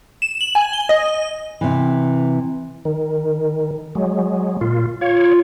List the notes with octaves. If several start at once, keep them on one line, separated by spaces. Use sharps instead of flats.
E7
F#7
G#5
G7
D#5
C3 E3
D#3
F#3 G#3
A#2 F4
F4 C#5